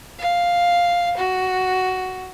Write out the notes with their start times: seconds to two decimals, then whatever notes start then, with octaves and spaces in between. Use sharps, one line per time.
0.18 F5
1.17 F#4